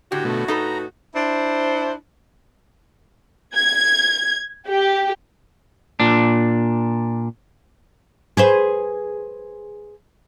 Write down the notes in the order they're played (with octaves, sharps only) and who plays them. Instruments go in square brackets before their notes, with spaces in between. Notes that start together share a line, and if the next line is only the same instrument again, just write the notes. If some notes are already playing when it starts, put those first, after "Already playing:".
[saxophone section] A2 F#4 [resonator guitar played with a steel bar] D3 [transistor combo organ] G4
[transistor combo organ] B2 A3
[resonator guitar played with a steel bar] D#4 A4 B4 [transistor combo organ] A#5
[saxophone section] D4 E4 C5
[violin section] G#6
G4
[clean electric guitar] A#2 D4
[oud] G#4 B4 C5